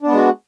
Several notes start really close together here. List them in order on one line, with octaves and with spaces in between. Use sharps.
D4 B3 G#3 F#4